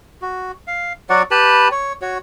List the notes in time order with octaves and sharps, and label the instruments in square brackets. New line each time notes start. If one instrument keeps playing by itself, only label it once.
[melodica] F#4
F5
F#3 F#4 D5 F#5
G4 B4 A5 B5
C#5
F#4 C#5